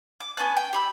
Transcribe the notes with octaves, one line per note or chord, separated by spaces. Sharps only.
D6
B3 C#4 A5 F#6
G5
G4 B5 E6